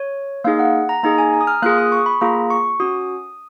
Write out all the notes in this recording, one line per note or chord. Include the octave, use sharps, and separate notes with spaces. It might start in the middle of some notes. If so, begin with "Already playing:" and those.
Already playing: C#5
A#3 D#4 G#4 F5
F#5
A#5
A#3 D#4 G#4 A#5
G#5
A#5
D#6
F6
A#3 F4 G#4 F#6
D#6
C#6
B5
A#3 F4 G#4 A#5
C#6
C#4 F#4 D#6